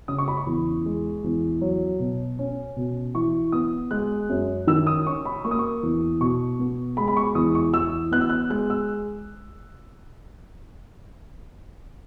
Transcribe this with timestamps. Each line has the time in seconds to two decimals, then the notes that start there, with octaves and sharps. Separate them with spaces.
0.08 C#3 D#6
0.18 C#6
0.28 B5
0.37 C#6
0.47 E2
0.85 G#3
1.24 E2
1.61 F#3
2.00 B2
2.39 C#4
2.76 B2
3.14 E3 C#6
3.52 B3 D#6
3.91 G#3 F#6
4.29 F#2
4.67 D#3 E6
4.87 D#6
5.06 C#4 C#6
5.25 B5
5.44 A#3 C#6
5.51 D#6
5.59 C#6
5.83 E2
6.20 B2 C#6
6.59 B3
6.97 G#3 B5
7.08 B5
7.17 C#6
7.35 E2 D#6
7.55 C#6
7.73 E3 E6
8.11 B3 F#6
8.21 E6
8.30 F#6
8.50 G#3 F#6
8.70 E6